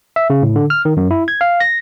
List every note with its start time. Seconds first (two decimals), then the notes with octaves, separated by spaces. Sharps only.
0.16 E5
0.30 C#3
0.42 A2
0.56 D3
0.70 F6
0.85 D#3
0.97 F#2
1.11 E4
1.28 G#6
1.41 F5
1.60 A#6